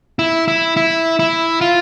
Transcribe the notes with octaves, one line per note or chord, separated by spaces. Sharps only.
E4
E4
E4
E4
F4